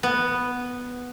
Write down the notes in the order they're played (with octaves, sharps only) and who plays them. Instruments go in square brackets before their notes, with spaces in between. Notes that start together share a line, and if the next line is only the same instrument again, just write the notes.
[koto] B3